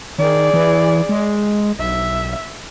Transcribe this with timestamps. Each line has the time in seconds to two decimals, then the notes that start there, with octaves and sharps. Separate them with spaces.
0.19 D#3 G#4 D5
0.54 E3
1.09 G#3
1.79 B1 E5